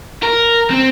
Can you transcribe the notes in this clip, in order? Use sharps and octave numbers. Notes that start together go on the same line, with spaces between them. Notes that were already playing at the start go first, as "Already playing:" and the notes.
A#4
C4